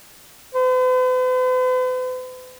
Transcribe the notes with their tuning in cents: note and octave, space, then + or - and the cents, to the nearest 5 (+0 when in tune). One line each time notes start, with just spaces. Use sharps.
B4 +45